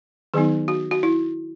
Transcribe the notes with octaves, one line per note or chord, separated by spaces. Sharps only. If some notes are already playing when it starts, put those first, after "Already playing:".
D#3 F#3 B3 D#4 G#4
F#4
F#4
E4